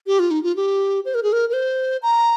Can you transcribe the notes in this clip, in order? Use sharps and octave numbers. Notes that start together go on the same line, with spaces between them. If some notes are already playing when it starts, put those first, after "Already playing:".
G4
F4
D#4
F4
G4
C5
A#4
G#4
A#4
A#4
C5
A#5